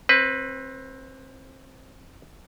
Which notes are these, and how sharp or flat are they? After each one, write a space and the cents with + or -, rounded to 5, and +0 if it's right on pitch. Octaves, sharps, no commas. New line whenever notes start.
C4 +25 B4 +0